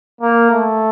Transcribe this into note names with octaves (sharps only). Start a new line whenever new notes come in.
A#3
A3